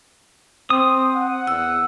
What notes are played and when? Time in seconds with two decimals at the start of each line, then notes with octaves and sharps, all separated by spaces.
0.70 C4 D#6
1.15 F#5
1.47 E2 E6